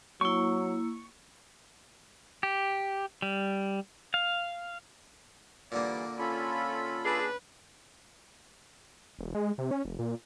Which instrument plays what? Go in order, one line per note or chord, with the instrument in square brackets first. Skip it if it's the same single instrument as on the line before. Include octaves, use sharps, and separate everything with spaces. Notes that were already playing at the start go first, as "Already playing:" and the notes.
[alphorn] F#3 [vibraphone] A#3 E4 [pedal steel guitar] C#6
[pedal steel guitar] G4
G3
F5
[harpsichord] A#2 D3 A#3 [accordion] E3 G3 [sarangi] D5
[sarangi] C#4 [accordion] F4 A4 B5
[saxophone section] D4 G#4 [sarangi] B4
[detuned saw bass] E1
G#3
C3
C#4
F1
A#2